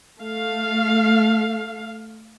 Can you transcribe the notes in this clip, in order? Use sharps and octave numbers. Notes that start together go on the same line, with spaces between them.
A3 F5